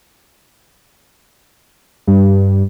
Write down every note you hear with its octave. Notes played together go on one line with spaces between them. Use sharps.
G2